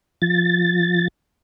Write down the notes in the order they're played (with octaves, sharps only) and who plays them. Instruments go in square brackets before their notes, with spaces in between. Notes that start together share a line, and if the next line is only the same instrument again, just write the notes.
[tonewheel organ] F3 A6